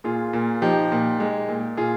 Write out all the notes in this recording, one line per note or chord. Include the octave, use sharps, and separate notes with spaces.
A#2 F4 G#4
A#2
F3 D#4 G4
A#2
G#3
A#2
A#2 F4 G#4